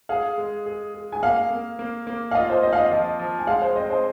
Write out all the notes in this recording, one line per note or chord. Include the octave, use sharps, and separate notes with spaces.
G#4 F5
G#3
G#4
G#4
G#5
A#3 F5
A#3
A#3
A#3
F5
F4 D#5
C5
C4 D#5
F5
D#5
F3 D#5
F3
G#5
G#3 F5
C5
C4 D#5
C5